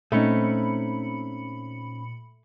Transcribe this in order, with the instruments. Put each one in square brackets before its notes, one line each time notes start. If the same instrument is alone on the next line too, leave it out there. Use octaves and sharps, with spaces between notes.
[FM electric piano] A#2 B5 C#7 [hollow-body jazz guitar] A3 [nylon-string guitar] C4 C#4 D#4